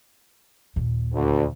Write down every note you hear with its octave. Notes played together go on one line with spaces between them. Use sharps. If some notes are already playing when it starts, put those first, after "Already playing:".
D#2 A#2
D2